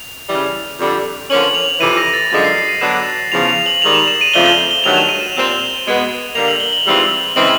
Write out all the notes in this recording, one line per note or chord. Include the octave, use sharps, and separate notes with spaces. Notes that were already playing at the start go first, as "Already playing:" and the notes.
Already playing: F7
C#3 E3 G3
F2 D3 G3
D3 F3 A#3 C#4 F#7
F7
F2 C3 E3 D#7
A#6
A6
F#2 D3 F3 G#3 A6
C7
C7
D#7
D3 F#3 B3 D4 E7
E2 C#3 F3 F7
F7
F#7
G#2 D#3 G3 F7
E7
E7
D#7
F2 C#3 F3 A3 D4 G7
G7
G7
G7
G2 D#3 F#3 A3 F7
E7
D#7
E7
A#2 G3 C4
B2 G#3 B3
D3 G3 A#3 F7
F#7
G7
F#7
G#2 E3 G3 C4 F4
C#3 E3 G#3 C4 F#7